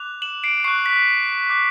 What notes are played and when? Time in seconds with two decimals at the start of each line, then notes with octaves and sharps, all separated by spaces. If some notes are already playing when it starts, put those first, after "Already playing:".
Already playing: D6 F#6 F7
0.22 E7 F#7
0.43 C7 D7
0.64 C#6 F#6 C7
0.86 B6
1.50 D6 F#6